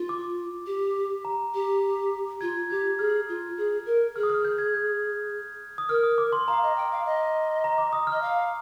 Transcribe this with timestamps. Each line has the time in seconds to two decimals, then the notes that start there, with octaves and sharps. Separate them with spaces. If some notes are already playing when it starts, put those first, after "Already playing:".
Already playing: F4
0.09 D6
0.67 G4
1.25 A#5
1.54 G4
2.41 F4 G#6
2.70 G4 G#6
2.99 G#4 F6
3.29 F4
3.57 G#4
3.86 A#4
4.16 G#4 F6
4.23 D#6
4.30 F6
4.45 G6
4.58 G#6
4.74 G6
5.78 D#6
5.89 A#4 F6
6.03 D#6
6.18 D6
6.33 C6
6.48 F5 A#5
6.63 D#5
6.77 G5
6.92 F5
7.05 D#5
7.64 A#5
7.78 D6
7.93 D#6
8.07 D#5 F6
8.21 F5